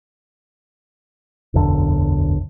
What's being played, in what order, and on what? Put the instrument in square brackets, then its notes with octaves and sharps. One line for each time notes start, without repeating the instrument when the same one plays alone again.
[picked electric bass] E1 B1 F#2 D3